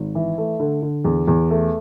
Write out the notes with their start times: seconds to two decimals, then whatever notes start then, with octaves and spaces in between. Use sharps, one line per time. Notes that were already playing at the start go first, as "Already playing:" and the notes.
Already playing: G#1
0.15 E3
0.38 A3
0.60 D3
0.82 D3
1.05 E2
1.28 E2
1.50 A3